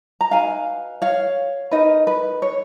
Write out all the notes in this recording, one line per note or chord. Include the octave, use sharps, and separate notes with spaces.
A#5
D#4 F#4 B4 F5 G#5
C#5 F5
D#4 A#4 B4 D#5
B4
C#5